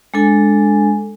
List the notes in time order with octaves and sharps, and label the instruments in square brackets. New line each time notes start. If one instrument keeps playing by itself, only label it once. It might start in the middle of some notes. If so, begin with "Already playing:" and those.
[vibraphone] G#3 D4 A4 G#5